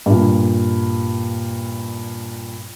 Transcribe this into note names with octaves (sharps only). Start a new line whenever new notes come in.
G2 A#2